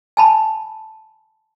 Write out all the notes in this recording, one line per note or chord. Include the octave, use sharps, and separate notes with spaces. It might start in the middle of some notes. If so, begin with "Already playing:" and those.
G#5 A5 B5